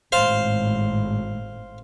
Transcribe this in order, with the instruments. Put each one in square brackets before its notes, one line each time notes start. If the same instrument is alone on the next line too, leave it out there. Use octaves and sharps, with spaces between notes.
[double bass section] G#1 A2 [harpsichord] C5 F5 C6